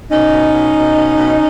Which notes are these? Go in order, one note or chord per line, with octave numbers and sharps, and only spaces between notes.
B2 C#4 D#4
B2
B2
B2
B2
B2